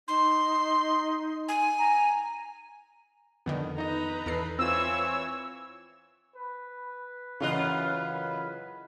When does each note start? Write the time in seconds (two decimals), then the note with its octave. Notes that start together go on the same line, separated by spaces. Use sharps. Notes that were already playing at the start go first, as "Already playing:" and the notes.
0.08 D#4 C6
1.48 G#5
1.79 A#5
3.46 F2 D3 D#3 B3
3.78 D#4 B4 D#5 A#5
4.26 E2 A4 B4 C7
4.59 E3 C4 F4 C#5 E6
6.36 B4
7.40 F#2 C#3 E3 F4 D#5 F#6